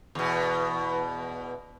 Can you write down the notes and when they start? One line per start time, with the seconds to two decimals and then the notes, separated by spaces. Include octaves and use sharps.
0.15 E2 B2